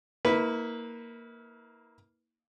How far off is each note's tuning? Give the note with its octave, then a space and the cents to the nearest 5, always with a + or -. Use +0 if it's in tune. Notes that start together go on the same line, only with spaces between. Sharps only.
A#3 +0 E4 -35 B4 +0